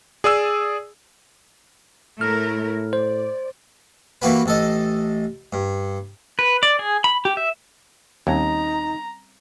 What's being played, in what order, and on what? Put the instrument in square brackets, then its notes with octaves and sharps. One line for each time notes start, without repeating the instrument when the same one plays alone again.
[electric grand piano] G#4 D5 D#6 E6
[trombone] A2 [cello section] A3 E4 A#4 [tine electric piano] F6
[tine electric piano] C5 [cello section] D5
[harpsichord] E3 A#3 F#4 G4 B4
A1 A4 D#5
G2
[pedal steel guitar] B4
D5
G#4
B5
G4
E5
[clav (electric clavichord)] D#2 [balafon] G3 C4 C#4 [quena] D#4 [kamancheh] A#5